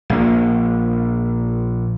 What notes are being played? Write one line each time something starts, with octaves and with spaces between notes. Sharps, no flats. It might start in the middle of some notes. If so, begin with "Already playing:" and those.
A#1 A#3